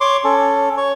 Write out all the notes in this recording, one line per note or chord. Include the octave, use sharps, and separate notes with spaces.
C#5 C6 D6
C#4 A4
C#5